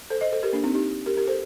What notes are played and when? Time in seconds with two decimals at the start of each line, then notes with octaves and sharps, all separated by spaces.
0.10 A4 C5
0.21 C5 D#5
0.32 A4 C5
0.43 G4 A#4
0.53 A#3 D4
0.64 C4 D#4
0.74 D#4 G4
1.06 G4 A#4
1.17 G4 A#4
1.27 A4 C5